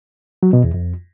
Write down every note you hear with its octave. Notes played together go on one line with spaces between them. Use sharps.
F#3
B2
E2
F2